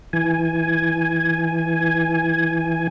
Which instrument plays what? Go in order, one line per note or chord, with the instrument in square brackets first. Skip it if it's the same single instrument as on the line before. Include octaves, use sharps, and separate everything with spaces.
[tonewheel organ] E3 G#5